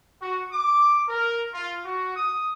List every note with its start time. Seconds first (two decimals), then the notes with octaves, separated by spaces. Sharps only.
0.18 F#4
0.49 D6
1.05 A#4
1.50 F4
1.83 F#4
2.13 D#6